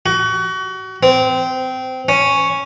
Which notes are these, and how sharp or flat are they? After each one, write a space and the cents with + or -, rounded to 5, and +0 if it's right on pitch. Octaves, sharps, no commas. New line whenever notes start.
F#4 +30
C4 -20
C#4 +0